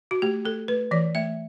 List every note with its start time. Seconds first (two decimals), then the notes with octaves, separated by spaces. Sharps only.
0.11 F#4
0.22 A3 G4
0.45 A3 A4
0.68 A3 B4
0.91 E3 D5
1.15 A3 E5